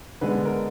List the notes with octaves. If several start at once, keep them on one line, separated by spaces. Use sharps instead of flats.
D3 G#3 B3 B4
A#4